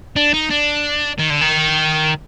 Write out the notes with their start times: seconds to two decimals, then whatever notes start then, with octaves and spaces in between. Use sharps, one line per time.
0.16 D4
0.33 D#4
0.50 D4
1.19 D#3
1.30 D3
1.41 D#3